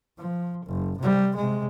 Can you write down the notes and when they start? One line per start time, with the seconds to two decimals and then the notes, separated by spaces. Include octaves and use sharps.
0.18 F3
0.66 F#1
0.99 C3 G3
1.36 C3 G#3